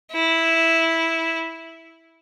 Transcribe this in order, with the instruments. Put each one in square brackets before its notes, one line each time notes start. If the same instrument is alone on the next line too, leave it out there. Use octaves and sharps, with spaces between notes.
[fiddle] E4